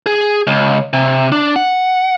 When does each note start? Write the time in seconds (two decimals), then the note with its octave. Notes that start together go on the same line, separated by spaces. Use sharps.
0.06 G#4
0.47 C#2
0.93 C3
1.32 D4
1.56 F#5